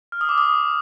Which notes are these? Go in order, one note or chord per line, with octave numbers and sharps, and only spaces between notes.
F6
D#6
D6
D#6